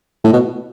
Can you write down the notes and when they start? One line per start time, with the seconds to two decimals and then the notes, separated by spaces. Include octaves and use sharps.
0.24 A2
0.33 B2